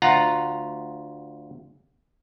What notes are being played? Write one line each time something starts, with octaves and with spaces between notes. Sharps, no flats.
D2 F4 F#5 A#5